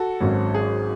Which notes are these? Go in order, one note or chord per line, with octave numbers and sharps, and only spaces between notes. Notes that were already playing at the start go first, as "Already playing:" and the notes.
Already playing: F#4 A4
G#1 G#2 F#3 C#4
G#4